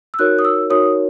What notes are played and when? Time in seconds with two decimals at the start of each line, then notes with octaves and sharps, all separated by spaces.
0.14 E6
0.19 D#4 F#4 A#4 C#5 F#6
0.39 D#6
0.45 E6
0.70 D#4 F#4 A#4 C#5 D#6